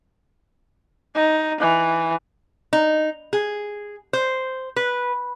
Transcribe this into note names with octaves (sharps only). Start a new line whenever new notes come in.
D#4
E3
D#4
G#4
C5
B4